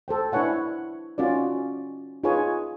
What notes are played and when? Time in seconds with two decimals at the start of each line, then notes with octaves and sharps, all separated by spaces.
0.08 A4 C5 G5
0.32 D4 E4 B4 C#5 F#5 G#5
1.18 C#4 D#4 F4 F#4 A#4 D5
2.24 D#4 F4 G#4 B4 C#5 G#5